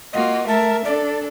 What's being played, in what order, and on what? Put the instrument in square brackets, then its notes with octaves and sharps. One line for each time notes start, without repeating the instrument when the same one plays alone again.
[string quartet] A#3 F4 F#4 [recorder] D#5
[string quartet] A3 A#4 E5 [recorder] A5
[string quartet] D4 A4 [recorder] D5